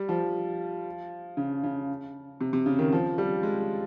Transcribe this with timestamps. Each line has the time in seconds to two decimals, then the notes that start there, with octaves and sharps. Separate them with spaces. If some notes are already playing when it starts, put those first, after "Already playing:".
Already playing: G3
0.09 F3
1.37 C#3
1.64 C#3
2.41 C3
2.53 C3
2.66 C#3
2.79 D#3
2.92 F3
3.18 G3
3.43 G#3